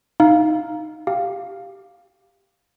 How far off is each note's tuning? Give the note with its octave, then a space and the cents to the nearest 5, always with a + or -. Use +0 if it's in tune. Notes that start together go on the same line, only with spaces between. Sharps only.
D#4 +0 F5 +0
G4 +0 F5 +0